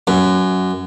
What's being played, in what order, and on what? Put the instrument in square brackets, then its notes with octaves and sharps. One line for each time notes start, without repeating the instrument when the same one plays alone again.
[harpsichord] F#2